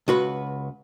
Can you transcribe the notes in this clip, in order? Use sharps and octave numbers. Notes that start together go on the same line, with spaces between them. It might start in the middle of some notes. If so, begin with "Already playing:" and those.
C#2 F#4 B4